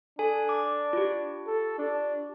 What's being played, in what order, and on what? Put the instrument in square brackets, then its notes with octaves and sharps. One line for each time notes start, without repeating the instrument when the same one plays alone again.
[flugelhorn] D4 [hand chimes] A4 G#5
[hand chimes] D6
F4 G4
[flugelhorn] A4
D4